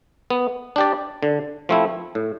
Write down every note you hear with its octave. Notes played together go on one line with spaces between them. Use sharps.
B3
D4 G4 D5
D3
F3 A3 C4 E4
A2